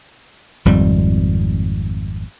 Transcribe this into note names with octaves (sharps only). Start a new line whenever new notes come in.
G#1 F2 G3